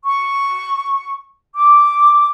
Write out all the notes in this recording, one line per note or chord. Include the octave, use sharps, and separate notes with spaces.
C#6
D6